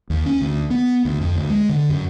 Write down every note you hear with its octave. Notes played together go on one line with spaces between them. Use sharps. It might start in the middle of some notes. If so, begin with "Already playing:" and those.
D#2
C#4
D2
B3
D2
F2
D2
G#3
D3
F#2